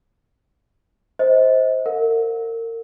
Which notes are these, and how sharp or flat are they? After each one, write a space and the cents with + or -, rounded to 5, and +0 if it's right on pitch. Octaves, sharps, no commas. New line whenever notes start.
C5 +0 D#5 +35
A#4 -35 F#5 -40